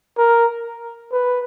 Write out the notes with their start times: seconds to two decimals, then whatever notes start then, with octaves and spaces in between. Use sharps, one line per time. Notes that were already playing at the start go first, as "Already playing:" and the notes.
0.18 A#4
1.12 B4